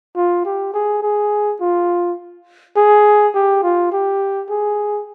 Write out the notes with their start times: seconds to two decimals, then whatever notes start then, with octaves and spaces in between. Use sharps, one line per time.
0.16 F4
0.45 G4
0.74 G#4
1.03 G#4
1.61 F4
2.76 G#4
3.35 G4
3.63 F4
3.92 G4
4.50 G#4